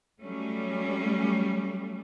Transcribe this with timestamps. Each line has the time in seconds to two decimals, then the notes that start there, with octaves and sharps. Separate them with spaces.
0.21 F#3 G3 A3 C#4